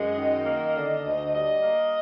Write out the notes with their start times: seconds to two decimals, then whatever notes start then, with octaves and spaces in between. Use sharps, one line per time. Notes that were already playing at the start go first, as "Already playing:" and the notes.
Already playing: F#2 G#3 D#5
0.17 D#3
0.46 A#3
0.76 D3
1.03 D2
1.33 G3 D#5
1.62 A#3